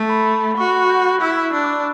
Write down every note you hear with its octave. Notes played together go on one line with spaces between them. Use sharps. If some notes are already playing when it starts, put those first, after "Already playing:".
Already playing: A3
B5
F#4 C#6
B5
C#6
G6
F#6
E4 E6
D4 E6
D6